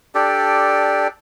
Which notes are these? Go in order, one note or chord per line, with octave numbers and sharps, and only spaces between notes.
D4 G4 A4 D5